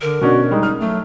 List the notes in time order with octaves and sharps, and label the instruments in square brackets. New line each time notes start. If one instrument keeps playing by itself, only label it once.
[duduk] D3 [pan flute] A#4
[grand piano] B2 C#4 D4 [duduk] F#4
[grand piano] G3 G#3 [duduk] D#4
[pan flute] G3 [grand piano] F6
[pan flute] F#3 [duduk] A3